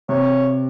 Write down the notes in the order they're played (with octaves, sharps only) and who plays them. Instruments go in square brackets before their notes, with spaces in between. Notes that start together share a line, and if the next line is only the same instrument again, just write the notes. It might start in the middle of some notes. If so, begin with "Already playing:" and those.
[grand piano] C3 [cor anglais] C#5